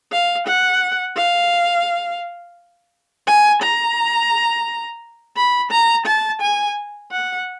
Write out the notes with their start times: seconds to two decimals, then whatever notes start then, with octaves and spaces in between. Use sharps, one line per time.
0.11 F5
0.47 F#5
1.17 F5
3.27 G#5
3.61 A#5
5.36 B5
5.71 A#5
6.06 A5
6.41 G#5
7.11 F#5